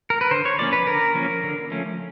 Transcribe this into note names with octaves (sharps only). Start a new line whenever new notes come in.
A#4
B4
D3 C5
C#5
F3 A#3 C#4 D5
B4
D3 A#4
F3 A#3 C#4
D3
F3 A3 C#4